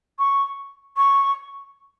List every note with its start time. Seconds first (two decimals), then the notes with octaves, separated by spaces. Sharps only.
0.19 C#6
0.97 C#6